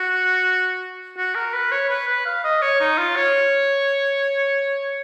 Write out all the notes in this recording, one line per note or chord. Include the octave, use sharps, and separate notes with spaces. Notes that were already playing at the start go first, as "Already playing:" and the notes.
Already playing: F#4
F#4
A#4
B4
C#5
B4
B4
F5
D#5
C#5
D#4
F4
C#5